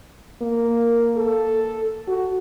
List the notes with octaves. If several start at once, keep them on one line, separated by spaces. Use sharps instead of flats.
A#3
A4
F#4